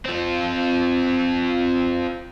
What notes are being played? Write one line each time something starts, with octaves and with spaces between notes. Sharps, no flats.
C4 F4